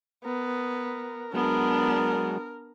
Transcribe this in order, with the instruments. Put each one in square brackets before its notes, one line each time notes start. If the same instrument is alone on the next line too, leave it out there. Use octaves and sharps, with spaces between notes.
[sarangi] B3 [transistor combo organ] A#4
[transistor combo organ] F#3 G#3 [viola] B3 D4 [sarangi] A#4